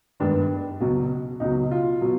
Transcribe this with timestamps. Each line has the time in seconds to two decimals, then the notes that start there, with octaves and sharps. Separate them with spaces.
0.20 G2 D#3 G#3 B3 D4
0.80 C#2 B2 F#3
1.40 C#2 B2 F#3 D#4
1.71 F4
2.01 B2 F#3